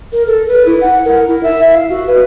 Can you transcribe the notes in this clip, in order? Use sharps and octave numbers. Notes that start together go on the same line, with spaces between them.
A#4
A4
B4
E4
F#5
A#4
E4
E5
F5
F#4
B4